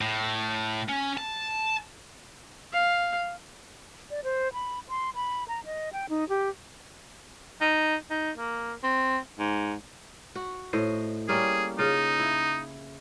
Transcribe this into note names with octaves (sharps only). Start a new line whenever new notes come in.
A2
C#4
A5
F5
D5
C5
B5
C6
B5
A#5
D#5
G5
D#4
G4
D#4
D#4
A#3
C4
G#2
F#4
A2 C5 D#5
G3 A#3 C#4 G#4
C#3 D#4 F4
E4